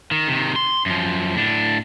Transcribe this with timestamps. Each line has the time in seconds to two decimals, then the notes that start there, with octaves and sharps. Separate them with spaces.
0.11 D#3
0.28 C3 D#3
0.56 C6
0.86 F#2 F3
1.35 A2 D4